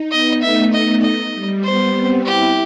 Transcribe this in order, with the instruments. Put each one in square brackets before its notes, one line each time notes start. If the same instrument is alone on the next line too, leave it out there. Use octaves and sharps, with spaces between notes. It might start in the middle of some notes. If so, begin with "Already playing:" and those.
Already playing: [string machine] D#4
[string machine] B3 [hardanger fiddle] D#5
[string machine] A3 [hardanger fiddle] E5
[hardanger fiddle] D#5
D#5
[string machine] G3
[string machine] B3 [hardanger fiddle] C5
[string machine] C4
[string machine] E4 [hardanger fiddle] G4